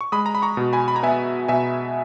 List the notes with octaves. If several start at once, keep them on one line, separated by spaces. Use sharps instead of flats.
C#6
G#3 B5 D#6
A#5
B5
A#5 C#6
B2
G#5 B5
B5
A#5
B3 E5 G#5
B2 E5 G#5